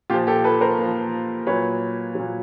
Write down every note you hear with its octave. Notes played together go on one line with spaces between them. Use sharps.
A#2 F3 F4 G4
G4 A4
A4 B4
A#4 C5
A#2 F3
A#2 F#3 B4 C#5
A#2 F#3